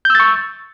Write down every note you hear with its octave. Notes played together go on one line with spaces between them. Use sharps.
C#6 E6 G6 A6